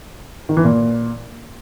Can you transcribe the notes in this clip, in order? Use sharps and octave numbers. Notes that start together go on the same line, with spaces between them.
D#3
E3
A#2